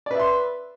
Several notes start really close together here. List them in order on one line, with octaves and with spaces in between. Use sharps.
D5 B4 E5 C6